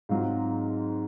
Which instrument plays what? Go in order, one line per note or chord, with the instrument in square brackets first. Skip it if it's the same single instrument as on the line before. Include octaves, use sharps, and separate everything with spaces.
[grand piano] G#2 F#3 C4 F4 F5